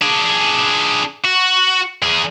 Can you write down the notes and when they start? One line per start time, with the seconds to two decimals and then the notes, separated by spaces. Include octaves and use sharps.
0.01 D4 G#4
1.24 F#4
2.02 E2 G#4